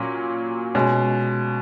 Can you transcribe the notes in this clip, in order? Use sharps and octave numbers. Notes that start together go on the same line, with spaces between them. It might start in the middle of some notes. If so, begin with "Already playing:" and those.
Already playing: A#2 F#3 C#4
B2 G#3 C#4